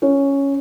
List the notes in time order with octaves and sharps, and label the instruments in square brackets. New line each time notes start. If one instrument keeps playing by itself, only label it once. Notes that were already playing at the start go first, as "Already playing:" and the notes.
[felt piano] C#4